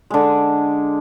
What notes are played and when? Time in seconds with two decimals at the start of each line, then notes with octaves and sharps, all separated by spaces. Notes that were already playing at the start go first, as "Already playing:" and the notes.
0.10 D3 G#3